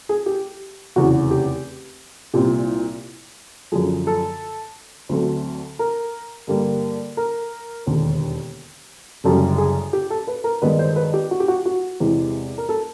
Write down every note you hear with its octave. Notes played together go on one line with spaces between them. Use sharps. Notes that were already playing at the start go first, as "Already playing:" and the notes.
G#4
G4
F1 E2 C#3 F#4
G4
C2 A#2 G3 C4 G4
F#2 D3 F3 G#4
A4
D2 D3 F#3 A3 C4
A#4
G2 D3 G3 A#3
A#4
E1 D#2 D3
F#1 F#2 D3 G3 A4
G#4
G4
A4
B4
A#4
G2 D#3 G#3 B3 B4
C5
B4
G4
F#4
G4
F#4
F#4
E2 C3 E3 G#3
A#4
A4